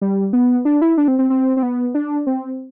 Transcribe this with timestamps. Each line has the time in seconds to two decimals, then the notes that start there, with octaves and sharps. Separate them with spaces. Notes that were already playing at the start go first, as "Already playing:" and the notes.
0.01 G3
0.33 B3
0.65 D4
0.81 E4
0.98 D4
1.08 C4
1.19 C4
1.30 C4
1.57 C4
1.63 B3
1.94 D4
2.27 C4